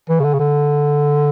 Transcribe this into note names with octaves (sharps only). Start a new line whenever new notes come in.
E3
C#3
D3
C#3
D3